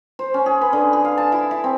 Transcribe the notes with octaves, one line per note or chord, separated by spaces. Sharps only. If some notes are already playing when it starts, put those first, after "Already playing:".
C5
C#4
G#4
B4
D3
G#4
F5
A5
E4
E5
C4